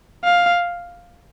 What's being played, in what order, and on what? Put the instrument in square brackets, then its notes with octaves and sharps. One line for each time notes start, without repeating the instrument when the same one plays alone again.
[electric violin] F5